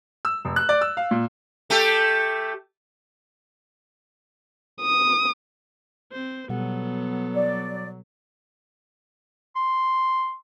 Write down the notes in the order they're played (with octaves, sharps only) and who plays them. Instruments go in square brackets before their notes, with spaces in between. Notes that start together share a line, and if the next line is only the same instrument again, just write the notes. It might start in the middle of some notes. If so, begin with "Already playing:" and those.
[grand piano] E6
F1
F#6
D5
E6
F5
A#2
[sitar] A3 G4 A4
[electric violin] D#6
C4 C5
[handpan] B2 G3 F#5 [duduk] F#3 [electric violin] B3 A4
[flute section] D5
[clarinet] C6